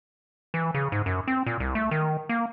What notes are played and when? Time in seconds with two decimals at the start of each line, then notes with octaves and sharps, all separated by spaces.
0.54 E3
0.74 C#3
0.92 G#2
1.06 F#2
1.28 C4
1.46 A#2
1.60 C2
1.75 A3
1.91 D#3
2.29 A#3